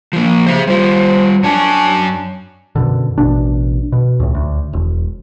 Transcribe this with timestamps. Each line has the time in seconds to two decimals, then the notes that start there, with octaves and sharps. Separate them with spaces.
0.13 F3 A#3
0.47 C#3 C5 E5
0.67 G3 F4 C5
1.43 F#2 D4 C#5 G#5
2.75 F#2 B2 D3
3.18 A1 B2 D4
3.92 B2
4.20 C#2 A2
4.34 D2
4.73 E1